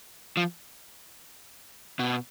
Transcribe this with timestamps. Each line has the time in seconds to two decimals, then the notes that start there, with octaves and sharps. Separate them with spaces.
0.37 F3
1.99 B2